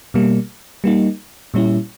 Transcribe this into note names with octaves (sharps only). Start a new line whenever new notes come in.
B2 G3 A#3
G3 A#3 D#4
A#2 G3 C#4 E4